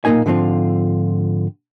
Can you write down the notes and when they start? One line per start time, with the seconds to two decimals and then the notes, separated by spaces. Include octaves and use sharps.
0.05 B1 A#2 G#3 A#3 D#4 G#5
0.26 G#2 D3 F3 C4 F4